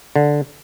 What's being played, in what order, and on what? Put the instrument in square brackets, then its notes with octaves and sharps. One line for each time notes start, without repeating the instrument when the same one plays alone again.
[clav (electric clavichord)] D3